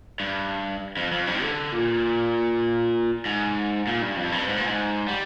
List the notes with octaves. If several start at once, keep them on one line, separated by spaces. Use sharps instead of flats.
G2
F2
F2
G2
D3
A#2
G#2
A#2
G2
F2
G2
G#2
A#2
G#2
G3